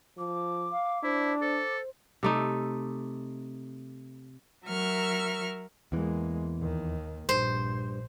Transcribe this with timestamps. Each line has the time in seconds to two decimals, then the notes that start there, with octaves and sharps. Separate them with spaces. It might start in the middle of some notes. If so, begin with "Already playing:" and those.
0.18 F3 D6
0.71 F5
1.03 D4 E4 C5
1.41 A4 C5
2.23 C3 A3 D#4
4.66 F#3 A#4 E5 C#6 F6
5.92 E2 E3 G#3 A#3
6.58 D#2 D#3
7.29 A#1 G2 C5